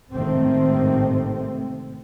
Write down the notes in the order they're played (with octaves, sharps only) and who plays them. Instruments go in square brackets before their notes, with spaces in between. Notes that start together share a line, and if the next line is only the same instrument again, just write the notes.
[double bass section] A1 G#2 C3 D#3 A3 C4